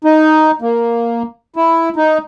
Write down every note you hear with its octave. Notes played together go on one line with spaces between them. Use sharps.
D#4
A#3
E4
D#4